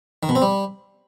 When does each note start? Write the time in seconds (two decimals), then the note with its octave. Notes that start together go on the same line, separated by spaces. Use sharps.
0.23 D#3
0.29 B2
0.35 C4
0.42 G3